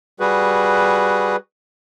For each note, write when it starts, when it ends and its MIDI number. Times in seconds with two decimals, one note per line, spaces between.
0.20 1.36 55
0.20 1.36 66
0.20 1.36 68
0.20 1.36 71